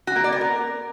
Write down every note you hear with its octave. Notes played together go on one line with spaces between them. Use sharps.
F#4
A#3
D5
B3
A#4